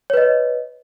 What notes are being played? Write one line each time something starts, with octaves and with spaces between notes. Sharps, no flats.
B4 C#5 D#5